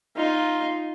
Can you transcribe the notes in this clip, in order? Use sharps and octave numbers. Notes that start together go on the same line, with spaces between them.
D#4 F4